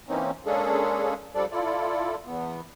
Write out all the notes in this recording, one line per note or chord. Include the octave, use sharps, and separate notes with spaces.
E3 A#3 C4 C#4 D#4
G#3 A#3 C#4 D4 G#4 A4
F3 G3 D4 A4 D5
E4 F4 A4 D5
E2 B3